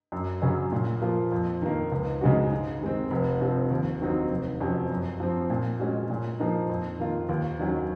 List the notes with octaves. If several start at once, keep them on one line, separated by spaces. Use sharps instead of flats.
F#2
C#3 F#3 C#4
A#2
F3 A#3 F4
F2
D#3 A#3
C#2
C#3 G#3 D#4 F#4
G#2
D#3 G#3 C4
F1
F2 C3 F3 C4
D#2
D#3 F#3 C4 D#4
F1
F2 C3 F#3 C#4
F#2
F3 C4
A#2
G#3 C#4 F#4
A#2
F3 A#3 D#4
F2
D#3 A#3 F4
D#2
D#3 F#3 C#4